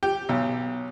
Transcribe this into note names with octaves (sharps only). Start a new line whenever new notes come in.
G4
B1